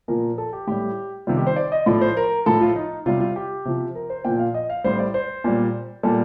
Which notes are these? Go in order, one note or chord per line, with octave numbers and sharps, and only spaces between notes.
A#2 F3 A#4
A4
G4
A2 G3 G4
C3 D#3 G3 F4
G4
C5
D5
D#5
A2 F3 D5
C5
A#4
A2 F3 A4
F4
D#4
C3 G3 F4
F4
G4
C3 F3
A#4
C5
A#2 F3 G5
F5
D#5
F5
A2 G3 C5
D5
C5
A#2 G3
A#2 G3 A4